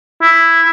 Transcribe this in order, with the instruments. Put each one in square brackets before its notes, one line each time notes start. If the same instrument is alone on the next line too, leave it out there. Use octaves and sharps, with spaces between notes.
[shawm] E4